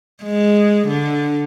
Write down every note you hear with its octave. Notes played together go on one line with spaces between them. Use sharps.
G#3
D3